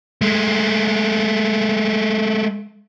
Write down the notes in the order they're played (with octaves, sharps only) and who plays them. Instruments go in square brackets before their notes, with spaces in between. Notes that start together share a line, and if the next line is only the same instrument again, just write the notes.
[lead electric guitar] G#3 A3